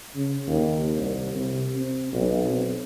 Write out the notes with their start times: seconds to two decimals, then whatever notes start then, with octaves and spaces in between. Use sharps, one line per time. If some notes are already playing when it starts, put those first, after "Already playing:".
0.15 C#3
0.47 D#2
0.97 C2
1.35 C3
1.76 C4
2.12 B1
2.50 C4